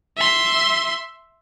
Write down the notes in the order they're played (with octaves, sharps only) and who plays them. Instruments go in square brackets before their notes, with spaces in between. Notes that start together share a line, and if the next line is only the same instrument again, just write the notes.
[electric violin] E5 C6